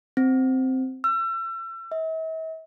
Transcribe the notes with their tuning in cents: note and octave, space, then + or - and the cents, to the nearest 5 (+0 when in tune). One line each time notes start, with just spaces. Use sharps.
C4 -5
E6 +35
E5 -45